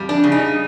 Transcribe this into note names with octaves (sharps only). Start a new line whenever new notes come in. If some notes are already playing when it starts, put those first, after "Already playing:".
Already playing: F2 G3
D4
C#3
D#4